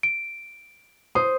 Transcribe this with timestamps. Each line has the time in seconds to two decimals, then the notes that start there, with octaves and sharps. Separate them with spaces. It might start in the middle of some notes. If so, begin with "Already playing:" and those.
0.03 D7
1.15 C5 D#6